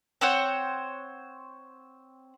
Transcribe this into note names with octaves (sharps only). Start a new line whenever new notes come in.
C4 C5 C#5 F#5